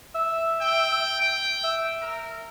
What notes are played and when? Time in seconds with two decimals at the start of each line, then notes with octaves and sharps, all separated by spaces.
0.15 E5
0.61 G5
1.20 G5
1.63 E5
2.02 A#4